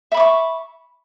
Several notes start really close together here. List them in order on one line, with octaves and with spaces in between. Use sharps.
E5 B5 D6 C#6